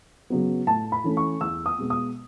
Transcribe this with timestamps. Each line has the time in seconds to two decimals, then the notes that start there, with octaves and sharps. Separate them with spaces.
0.30 C#3 F#3 B3
0.67 A2 A5
0.92 B5
1.04 E3 A3 C#4
1.17 C#6
1.41 E2 E6
1.66 D#6
1.78 B2 G#3 B3
1.90 D#6